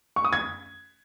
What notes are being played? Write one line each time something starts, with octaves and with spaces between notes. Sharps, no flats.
C#6
D#6
G#6